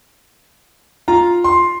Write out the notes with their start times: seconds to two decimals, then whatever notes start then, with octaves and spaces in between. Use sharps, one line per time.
1.08 F4 A#5
1.44 C6